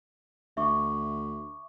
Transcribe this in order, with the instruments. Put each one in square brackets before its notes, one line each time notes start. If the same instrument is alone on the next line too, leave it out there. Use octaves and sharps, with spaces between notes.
[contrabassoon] D2 [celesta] E5 C#6 D6